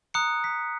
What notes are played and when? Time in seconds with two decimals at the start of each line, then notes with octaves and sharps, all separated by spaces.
0.14 A#5 D#6 F#6 C#7
0.44 B6